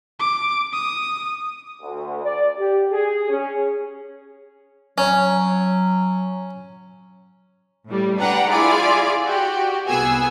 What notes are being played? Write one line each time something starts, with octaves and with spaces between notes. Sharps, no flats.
D6
D#6
D2
D5
G4
G#4
C#4
F#3 C#4
A2 G3
D4 B4 F#5 G5 A#5
E4 F4 G#4 D5 G#5 D6
F#4 G4
C2 B3 G#4 G#5 E6